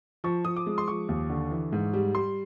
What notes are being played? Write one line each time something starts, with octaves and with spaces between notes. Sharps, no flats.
F3 C#6
F3 D#6
D6
G#3
C6
F3 C#6
D#2
D3
E3
G#2
G3
G3 C6